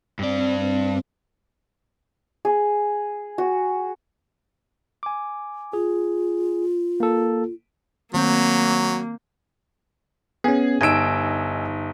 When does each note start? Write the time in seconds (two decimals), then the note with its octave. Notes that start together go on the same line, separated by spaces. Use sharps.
0.19 G2 C4 D5
2.45 G#4
3.38 F#4
5.03 G#5 D6
5.73 F4 G#4
7.00 A#3 A4
8.14 D#3 F#3 A#3 C4 G6
10.44 B3 C#4 G#4
10.81 G1 D#4 G#5 E6 D7